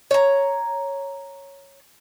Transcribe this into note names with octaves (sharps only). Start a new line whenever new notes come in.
C#5 A#5